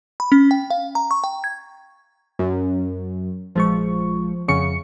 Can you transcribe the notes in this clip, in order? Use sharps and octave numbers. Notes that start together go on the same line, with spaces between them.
B5
C#4
G5
F5
A#5
C#6
G5
G#6
F#2
A#1 F3 G#3 C#6
F2 C#3 C#6 C#7